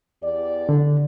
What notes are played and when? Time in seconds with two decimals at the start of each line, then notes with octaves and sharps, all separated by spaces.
0.23 E2 G4 D5
0.69 D3